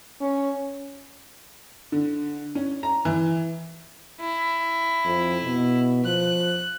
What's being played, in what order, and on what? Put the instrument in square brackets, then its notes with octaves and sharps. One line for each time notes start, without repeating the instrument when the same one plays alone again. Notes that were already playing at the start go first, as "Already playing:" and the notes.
[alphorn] C#4
[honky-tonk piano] D3
C#4
A#5
E3
[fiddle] E4
[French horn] F2
B2
[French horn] F3 [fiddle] F#6